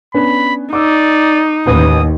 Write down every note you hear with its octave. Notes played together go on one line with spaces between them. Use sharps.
B3 C#4 D4 B5
D#4 D5 D6 E6
A1 D#2 B4 D#6